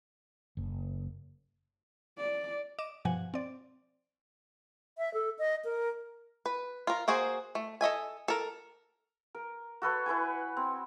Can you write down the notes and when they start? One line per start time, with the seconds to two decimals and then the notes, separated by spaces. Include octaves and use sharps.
0.57 F#1
2.18 D5
2.79 D#5 D6 E7
3.05 G2 B2 F3 F#5 G#5
3.34 C4 D5
4.98 E5
5.14 A4
5.39 D#5
5.65 A#4
6.46 B4
6.87 F4 A#4
7.08 A#3 F#4 G#4 C5
7.55 A3
7.81 A4 D#5 E5 G#5
8.28 A4 A#4
9.35 A#4
9.82 F#4 A4 B4 C#5
10.06 E4 B4 C#5 G#5
10.57 C4